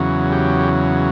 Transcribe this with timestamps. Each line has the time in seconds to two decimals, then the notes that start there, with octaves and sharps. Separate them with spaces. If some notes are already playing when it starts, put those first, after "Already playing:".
Already playing: E2 C#3 F#3
0.32 G4